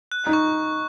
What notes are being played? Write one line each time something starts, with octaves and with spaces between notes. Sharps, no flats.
F#6
D#4
C#6